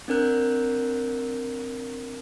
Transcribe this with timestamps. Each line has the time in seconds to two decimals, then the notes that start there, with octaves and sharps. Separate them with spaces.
0.08 C4 D4 A#4 F#6 G6